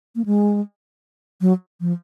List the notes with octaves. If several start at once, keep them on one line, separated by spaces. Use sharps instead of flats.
A#3
G#3
F#3
F3